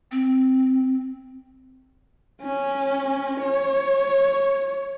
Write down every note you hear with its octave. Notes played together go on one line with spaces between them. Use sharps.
C4
C#4
C#5